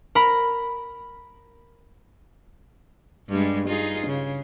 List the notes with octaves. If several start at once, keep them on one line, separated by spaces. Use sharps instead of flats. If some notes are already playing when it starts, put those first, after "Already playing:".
A#4 B5
G2 G3 G#3
D#4 F4 G#4
C#3